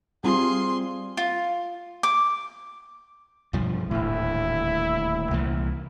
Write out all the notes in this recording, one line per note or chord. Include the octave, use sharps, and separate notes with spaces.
G3 C4 F4 G#4 C6
F4
D6
B1 G2 F3
D#1 D2 A2 E4
C2 A#2 E3